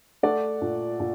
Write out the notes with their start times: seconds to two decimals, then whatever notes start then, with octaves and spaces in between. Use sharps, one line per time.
0.23 A3 D5 F#5
0.62 A#2
1.00 A#2